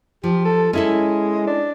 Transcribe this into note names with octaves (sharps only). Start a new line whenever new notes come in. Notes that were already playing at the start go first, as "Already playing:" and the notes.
F3 G4
A4
G#3 C#4 E4 A4
D4